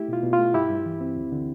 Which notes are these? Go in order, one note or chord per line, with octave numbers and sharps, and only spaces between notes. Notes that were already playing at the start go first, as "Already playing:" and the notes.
Already playing: A3 E4 G4
B2 F4
B2
F4
A3
G2 E4 G4
G2
E3
C4
D2
D3